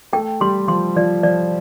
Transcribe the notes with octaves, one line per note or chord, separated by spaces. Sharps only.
A3 A4 G5
G3 G4 C6
F3 F4 C6
F3 F4 D5
F3 D5